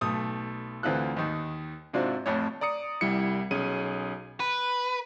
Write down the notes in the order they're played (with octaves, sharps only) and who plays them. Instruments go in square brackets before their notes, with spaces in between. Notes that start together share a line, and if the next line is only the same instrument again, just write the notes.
[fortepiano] B1 A3 D#6
D2 E3 C4 F4 A4 F#6
D#2 D#3
G#2 C3 C4 D4 F4 F#4
A1 F2 A2 C#5
[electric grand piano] D5 A#5 D#6 C#7
C2 G3 E4 C#7
B1 C#4 G#4 D#7
[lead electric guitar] B4